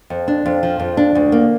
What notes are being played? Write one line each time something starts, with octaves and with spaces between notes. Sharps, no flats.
F2
D4
F2
F3
F2
D4
D2
A#3